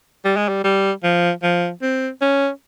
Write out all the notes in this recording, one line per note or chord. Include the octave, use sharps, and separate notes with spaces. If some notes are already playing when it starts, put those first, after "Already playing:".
G3
G#3
G3
G3
F3
F3
C4
C#4